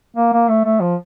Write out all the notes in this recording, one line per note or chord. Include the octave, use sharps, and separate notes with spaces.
A#3
A#3
A3
A3
F3